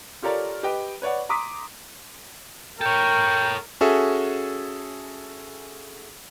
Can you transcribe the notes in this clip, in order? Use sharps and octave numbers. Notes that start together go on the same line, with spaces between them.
F4 G4 A4 A#4 C#5 D5
G4 B4 D#5 G5
B4 C#5 D5 F#5
A#5 C6 D6 D#6 B6
A4 A#4 C#5 G5
C#4 F#4 G#4 A4 E5